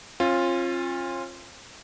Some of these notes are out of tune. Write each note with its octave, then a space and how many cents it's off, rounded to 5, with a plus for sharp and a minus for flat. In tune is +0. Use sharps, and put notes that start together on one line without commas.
C#4 -45 F4 +0